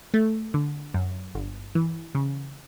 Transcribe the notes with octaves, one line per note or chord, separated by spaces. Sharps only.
A3
D3
F#2
G1
E3
C#3